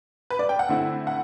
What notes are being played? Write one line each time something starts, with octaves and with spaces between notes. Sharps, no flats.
B4
D5
G5
F#5
D3 A3 C4 E4
F#5